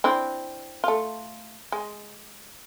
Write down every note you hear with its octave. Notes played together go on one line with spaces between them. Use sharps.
C4 D4 E4
A3 F4
G#3